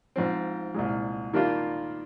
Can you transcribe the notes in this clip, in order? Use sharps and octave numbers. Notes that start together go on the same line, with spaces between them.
G#2 F3 C4
C2 A#2 G#3
D#3 G3 A#3 D4 F4